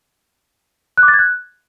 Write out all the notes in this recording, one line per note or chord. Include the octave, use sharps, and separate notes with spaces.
F#6
D6
A6
G#6
F#6